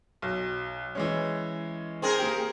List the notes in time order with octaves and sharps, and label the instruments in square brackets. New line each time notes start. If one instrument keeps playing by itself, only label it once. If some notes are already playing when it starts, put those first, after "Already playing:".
[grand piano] B1
E3 G#3 C#4
[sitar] C4 G#4 A#4
[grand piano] A#3 G4